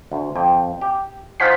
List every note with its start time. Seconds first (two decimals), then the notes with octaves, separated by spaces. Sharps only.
0.12 D2
0.36 F2 G5
0.81 G4
1.40 D#4 F4 G#4 C5 F#5 B6